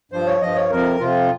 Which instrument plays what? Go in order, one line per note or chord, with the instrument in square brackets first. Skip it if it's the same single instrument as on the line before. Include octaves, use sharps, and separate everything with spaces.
[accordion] G2 F3 C5
C#5
G2 F3 D#5
C#5
F2 C3 F3 A#4
F2 C3 F3 F4